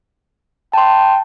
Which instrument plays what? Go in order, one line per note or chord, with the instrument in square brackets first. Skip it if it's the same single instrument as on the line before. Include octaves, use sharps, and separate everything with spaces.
[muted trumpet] G5 [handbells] A5 C6